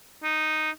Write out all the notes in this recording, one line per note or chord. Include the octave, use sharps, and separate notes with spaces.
D#4